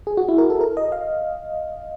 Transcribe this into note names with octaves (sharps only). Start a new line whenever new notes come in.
G#4
F#4
E4
A#4
A4
A#4
D#5
F5